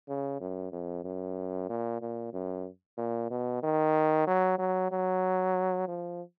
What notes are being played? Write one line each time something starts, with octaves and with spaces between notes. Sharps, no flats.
C#3
F#2
F2
F#2
A#2
A#2
F#2
A#2
B2
D#3
F#3
F#3
F#3
F3